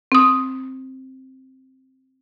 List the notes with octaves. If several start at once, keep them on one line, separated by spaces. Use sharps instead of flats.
C4 D#6